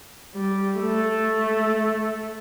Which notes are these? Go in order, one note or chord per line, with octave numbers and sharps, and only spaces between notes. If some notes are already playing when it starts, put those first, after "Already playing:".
G3
A3